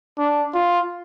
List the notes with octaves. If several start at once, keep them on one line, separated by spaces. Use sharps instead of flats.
D4
F4